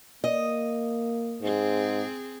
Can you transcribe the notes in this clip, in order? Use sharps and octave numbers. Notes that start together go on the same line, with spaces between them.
A#3 D#5
G#2 C4 G#4